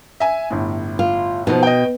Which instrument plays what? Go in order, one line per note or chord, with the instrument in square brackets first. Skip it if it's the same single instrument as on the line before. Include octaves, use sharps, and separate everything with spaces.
[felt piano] E5 G#5
G1 A2
[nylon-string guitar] F4
[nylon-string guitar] B2 [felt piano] F3 B3 D#4
[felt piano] D#5 G5